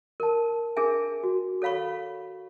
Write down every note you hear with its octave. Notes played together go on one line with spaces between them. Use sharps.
A#4 A5
D4 G#4 A#4 E5 G#5
F#4
A4 C#5 F5 B5 C#6